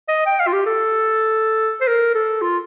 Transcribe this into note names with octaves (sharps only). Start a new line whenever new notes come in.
D#5
G5
F5
F4
G4
A4
C5
A#4
A4
F4